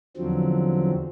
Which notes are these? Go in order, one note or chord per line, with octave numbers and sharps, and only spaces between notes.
E2 D3 F3 F#3 C4